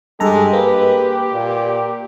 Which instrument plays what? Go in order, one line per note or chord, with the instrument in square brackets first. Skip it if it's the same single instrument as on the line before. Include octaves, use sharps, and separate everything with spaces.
[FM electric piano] G2 A4 A#5 [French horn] G#3 [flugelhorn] G4
[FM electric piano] A#3 [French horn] B4
[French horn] A#2